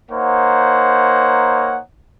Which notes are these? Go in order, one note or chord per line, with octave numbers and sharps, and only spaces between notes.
A#3 D#4 C5 C#5 F#5